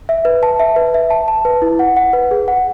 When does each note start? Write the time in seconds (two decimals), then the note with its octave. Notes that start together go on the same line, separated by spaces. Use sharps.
0.09 E5
0.25 B4
0.43 A5
0.60 E5
0.76 B4
0.94 E5
1.10 A5
1.28 A5
1.45 B4
1.62 E4
1.79 F#5
1.96 F#5
2.13 B4
2.31 G#4
2.48 F#5